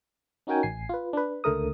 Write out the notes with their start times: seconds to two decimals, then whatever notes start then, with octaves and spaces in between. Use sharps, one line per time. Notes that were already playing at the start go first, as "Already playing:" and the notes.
0.47 C#4 D#4 F#4 A#4 G5 G#5
0.63 A1 G#5 C7
0.89 F4 B4
1.13 D4 B4
1.44 C#2 D3 A3 A#4 D#6